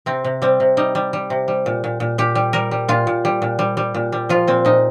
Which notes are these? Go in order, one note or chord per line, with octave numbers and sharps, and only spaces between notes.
C3 C4
C3
G3 C4
C3
G3 D#4
G3
G3
C3
G3
A#2
A#2
A#2
A#2 G4
G3
G3 A#4
G3
A#2 F4
A#2
G3
A#2
G3
G3
A#2
G3
F3 F4
A#2 C4
A#2 D#4